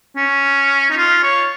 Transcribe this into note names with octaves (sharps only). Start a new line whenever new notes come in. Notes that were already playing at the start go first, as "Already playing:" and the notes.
C#4
D#4
F4
C#5